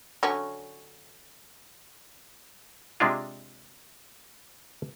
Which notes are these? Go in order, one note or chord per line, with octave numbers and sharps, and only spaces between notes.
D3 F#3 C#4
C3 G#3 D4 F4